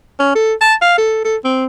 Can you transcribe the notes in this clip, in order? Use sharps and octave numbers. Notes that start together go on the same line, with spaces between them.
C#4
A4
A5
F5
A4
A4
C4